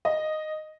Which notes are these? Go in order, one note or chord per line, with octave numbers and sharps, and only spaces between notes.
D#5